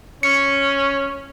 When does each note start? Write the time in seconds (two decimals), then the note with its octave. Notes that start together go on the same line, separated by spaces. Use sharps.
0.23 C#4 C#7